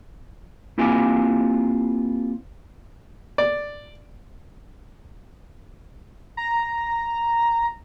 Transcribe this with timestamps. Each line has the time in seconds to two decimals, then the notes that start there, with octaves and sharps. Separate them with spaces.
0.78 A#3 C4 E4 F4 G4 G#5
3.38 D5
6.37 A#5